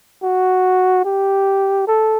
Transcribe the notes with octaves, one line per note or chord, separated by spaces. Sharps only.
F#4
G4
A4